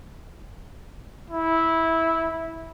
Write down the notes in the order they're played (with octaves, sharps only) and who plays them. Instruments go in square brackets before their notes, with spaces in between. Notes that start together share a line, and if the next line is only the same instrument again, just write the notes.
[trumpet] E4